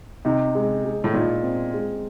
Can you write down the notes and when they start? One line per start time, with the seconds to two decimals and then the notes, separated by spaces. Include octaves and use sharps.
0.25 C3 D#4
0.55 G#3
0.85 G#3
1.04 A2
1.14 A#2 D#4
1.43 C4
1.74 G#3